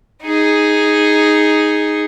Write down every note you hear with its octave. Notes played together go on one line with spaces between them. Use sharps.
D#4 G#4